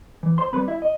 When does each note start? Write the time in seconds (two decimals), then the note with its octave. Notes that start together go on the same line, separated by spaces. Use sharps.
0.23 E3
0.38 C5 C6
0.53 G3 C4 B4 B5
0.68 E4 E5
0.82 D#5